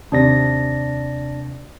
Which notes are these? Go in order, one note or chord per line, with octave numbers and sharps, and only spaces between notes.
D#2 C3 D4 D5 A#6